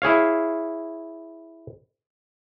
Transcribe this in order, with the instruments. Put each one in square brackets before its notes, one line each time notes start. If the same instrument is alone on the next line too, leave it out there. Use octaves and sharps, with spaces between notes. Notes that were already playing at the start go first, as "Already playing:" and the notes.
[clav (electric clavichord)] E4 G#4 C#5 F5